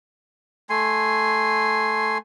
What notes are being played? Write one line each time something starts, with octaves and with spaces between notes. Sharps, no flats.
A3 G#5 C6